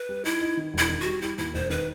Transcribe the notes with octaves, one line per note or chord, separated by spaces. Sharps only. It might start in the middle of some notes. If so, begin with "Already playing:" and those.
Already playing: B4
G3
D#4 E4
D#4
D#3
E1 E4
D#3
F#4
G3
G3 E4
D#2 E4
E1 C5
D#3 B4